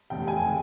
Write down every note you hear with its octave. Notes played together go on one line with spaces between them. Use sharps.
F1 E2 C3 G5
G#5
D#3 G#3